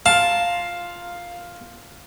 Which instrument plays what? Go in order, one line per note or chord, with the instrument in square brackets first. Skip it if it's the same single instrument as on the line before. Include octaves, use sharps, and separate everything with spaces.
[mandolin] F4 A#4 [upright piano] F5 [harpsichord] A5